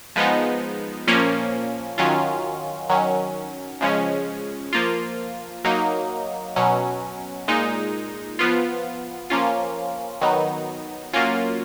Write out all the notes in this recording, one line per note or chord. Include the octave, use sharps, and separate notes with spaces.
F3 G#3 B3 D#4
A#2 F3 A#3 C#4
D#3 F#3 C#4 F4
D#3 F#3 C#4
C#3 F3 G#3 C#4
F3 A#3 F4
F#3 A#3 D#4
B2 F#3 C#4
A#2 G#3 D#4
F3 B3 F4
F3 A#3 C#4 F4
D#3 F#3 B3 D#4
F#3 A#3 C#4 F4